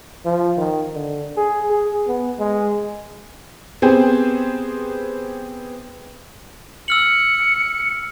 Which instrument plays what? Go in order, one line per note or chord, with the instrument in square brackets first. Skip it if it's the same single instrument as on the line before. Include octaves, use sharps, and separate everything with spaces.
[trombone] F3
D#3
D3
G#4
G#4
B3
G#3
[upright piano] B3 C4 G4 G#4 C5
[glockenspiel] E6 F6 F#7 [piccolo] C#7